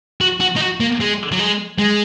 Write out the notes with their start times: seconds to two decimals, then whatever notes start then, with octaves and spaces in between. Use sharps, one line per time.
0.21 F#4
0.40 F#4
0.56 D#4
0.61 F#4
0.80 A#3
1.00 G#3
1.32 F#3
1.39 G#3
1.79 G#3